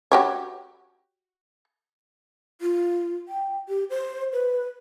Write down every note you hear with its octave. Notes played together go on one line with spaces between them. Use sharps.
F#4 G4 C#5
F4
G5
G4
C5
B4